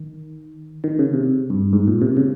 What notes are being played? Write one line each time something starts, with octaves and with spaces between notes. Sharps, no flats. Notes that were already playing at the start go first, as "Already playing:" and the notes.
Already playing: D#3
D#3
C#3
C3
G2
G#2
A#2
C3
C#3